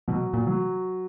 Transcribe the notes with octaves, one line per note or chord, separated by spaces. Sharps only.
B2 F#3
A#2
F#3